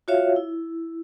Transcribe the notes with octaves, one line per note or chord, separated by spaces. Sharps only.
F4 F#4 C#5 E5 F5
E4